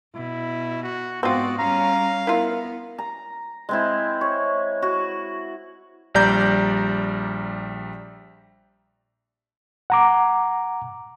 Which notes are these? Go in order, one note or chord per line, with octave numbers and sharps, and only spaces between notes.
B2 E4
F#4
G#2 B3 C4 F4 F#4 D5
G3 C#4 F5 A#5
B3 E4 F4 A#4
A#5
G#3 C4 E4
C#5
F#4
A#1 G3 D5 A#5 G6
F#5 A#5 D6